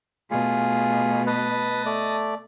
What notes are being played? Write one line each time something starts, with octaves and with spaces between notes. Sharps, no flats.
B2 A3 F4 G#4
B4 D#5 A5
A3 D5